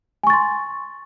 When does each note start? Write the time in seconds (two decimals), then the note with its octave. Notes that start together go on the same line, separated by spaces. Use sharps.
0.23 G#5
0.27 C#6
0.30 A6
0.33 C6